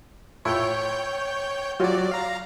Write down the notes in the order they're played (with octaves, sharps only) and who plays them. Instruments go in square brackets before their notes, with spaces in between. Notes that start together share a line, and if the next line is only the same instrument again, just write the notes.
[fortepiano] A2 E4 F4 [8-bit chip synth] C#5 G5 G6
[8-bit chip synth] F#3 D5 [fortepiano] F4 F#4 C#5
[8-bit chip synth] F5 A#5